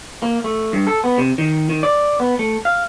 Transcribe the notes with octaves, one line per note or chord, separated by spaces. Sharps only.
A#3
A3
G2
A4
B3
C3
D#3
D#3
D5
B3
A3
F5